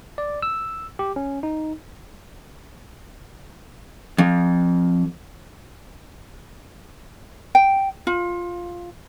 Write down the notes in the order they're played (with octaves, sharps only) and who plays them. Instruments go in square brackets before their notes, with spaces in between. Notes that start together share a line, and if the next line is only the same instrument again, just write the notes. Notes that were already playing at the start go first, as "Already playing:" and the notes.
[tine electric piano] D5
E6
G4
C#4
D#4
[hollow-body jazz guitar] F2
[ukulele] G5
F4